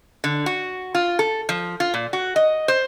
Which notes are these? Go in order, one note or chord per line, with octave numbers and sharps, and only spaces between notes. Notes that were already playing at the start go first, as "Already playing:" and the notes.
D3
F#4
F4
A4
F3
F4
A#2
F#4
D#5
C5